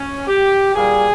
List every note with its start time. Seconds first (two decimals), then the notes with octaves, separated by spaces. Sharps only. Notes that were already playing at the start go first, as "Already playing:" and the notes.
Already playing: C#4
0.27 G4
0.75 A#2 G3 A#3 G#4